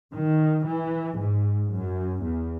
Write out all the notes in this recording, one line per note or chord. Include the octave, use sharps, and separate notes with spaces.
D#3
E3
G#2
F#2
E2